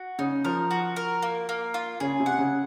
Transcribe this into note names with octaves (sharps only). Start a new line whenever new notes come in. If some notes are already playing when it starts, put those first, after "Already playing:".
Already playing: F#4
C#3 D#4
F3 A#4
F#4
A#4
A#3
A#3
F4
C#3 G#4
C3
F#5
C#3